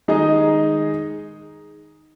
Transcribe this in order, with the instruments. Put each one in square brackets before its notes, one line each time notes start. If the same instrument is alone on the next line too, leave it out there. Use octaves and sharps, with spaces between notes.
[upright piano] D#3 G#3 D#4 G#4 D#5